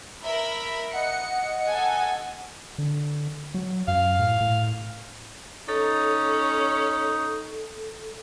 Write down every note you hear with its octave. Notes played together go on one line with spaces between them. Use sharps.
A#4 E5 B5
D#5 F#5 C#7
A4 G#5
D3
F#3
F#2 F5
A2
A2
C#4 D#4 A4